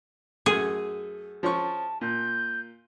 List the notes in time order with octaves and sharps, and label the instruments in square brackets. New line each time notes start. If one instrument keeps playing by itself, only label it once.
[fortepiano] F#2 A3 [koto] G#4
[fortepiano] F3 C#4 C#6 [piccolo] A5
[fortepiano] A#2 [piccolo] G6